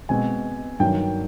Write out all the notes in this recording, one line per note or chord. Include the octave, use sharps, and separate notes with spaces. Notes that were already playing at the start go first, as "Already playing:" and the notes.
B2 G#3 C4 G#5
G2 D#3 F#3 A#3 G5